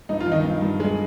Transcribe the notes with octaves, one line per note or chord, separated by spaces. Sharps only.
G2 D#4
F4
D#3 F3 D#4
G2
G2
G#3